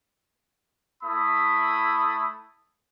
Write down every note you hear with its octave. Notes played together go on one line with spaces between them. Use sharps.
A3 E4 B5 D#6